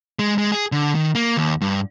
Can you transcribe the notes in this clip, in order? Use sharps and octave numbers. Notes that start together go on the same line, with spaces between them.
G#3
G#3
G#4
D3
D#3
A#3
D#2
G2